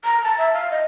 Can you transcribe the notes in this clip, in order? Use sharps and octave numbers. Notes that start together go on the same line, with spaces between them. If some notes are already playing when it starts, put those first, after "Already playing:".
A#5
A5
E5
F5
D#5